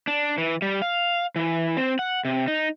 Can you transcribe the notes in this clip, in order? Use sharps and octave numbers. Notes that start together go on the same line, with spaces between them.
D4
E3
G3
F5
E3
C4
F#5
C3
D#4